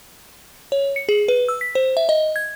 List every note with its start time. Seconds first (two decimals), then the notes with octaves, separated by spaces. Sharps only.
0.72 C#5
0.96 C#7
1.09 G#4
1.28 B4
1.48 E6
1.61 B6
1.75 C5
1.97 E5
2.09 D#5
2.36 G#6